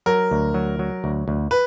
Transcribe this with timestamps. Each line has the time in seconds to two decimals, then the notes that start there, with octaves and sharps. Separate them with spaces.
0.06 F#3 A#4
0.31 D2
0.54 F#3
0.79 F#3
1.04 D2
1.28 D2
1.51 B4